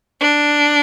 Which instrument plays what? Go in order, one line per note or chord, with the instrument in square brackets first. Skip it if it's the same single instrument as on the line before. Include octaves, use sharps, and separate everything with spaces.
[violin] D4